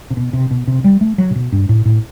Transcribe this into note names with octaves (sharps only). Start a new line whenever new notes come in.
C3
B2
C3
B2
C3
G3
A3
F#3
C3
B2
G2
A2
A2